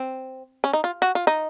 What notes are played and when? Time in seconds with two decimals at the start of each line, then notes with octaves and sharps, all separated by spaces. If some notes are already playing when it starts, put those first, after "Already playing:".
Already playing: C4
0.64 C#4
0.73 D#4
0.84 F4
1.02 F#4
1.15 F4
1.27 D#4